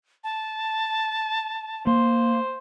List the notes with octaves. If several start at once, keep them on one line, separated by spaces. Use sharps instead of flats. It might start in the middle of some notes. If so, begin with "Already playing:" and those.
A5
A#3 C5